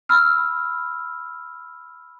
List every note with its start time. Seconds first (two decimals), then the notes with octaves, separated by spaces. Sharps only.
0.09 B5 E6 F6